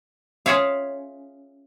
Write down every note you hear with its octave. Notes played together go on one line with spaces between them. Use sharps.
C#4 F4 G#4 C#5 E5 F5